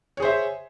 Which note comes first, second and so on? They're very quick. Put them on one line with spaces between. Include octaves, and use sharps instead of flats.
C#5 G#4 C5 E5